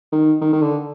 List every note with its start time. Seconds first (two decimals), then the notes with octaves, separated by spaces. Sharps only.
0.12 D#3
0.41 D#3
0.53 D#3
0.62 D3